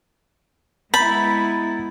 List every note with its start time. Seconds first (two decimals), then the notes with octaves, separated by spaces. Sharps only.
0.94 G#3 B3 E4 A#5 B5 G6 A6